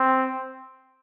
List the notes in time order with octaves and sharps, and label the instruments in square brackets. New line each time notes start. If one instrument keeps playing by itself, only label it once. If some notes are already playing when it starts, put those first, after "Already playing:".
Already playing: [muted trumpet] C4